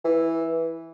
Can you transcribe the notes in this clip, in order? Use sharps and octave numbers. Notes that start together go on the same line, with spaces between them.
E3